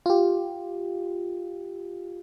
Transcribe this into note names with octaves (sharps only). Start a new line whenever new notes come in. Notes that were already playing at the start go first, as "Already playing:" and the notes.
F4 G4